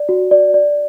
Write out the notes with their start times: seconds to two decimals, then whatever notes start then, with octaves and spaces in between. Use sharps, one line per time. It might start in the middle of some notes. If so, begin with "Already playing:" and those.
Already playing: D5
0.09 F#4
0.31 D5
0.54 D5